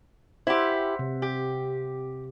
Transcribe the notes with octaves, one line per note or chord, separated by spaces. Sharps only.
E4 G4 C5 E5 F#5
C3
G4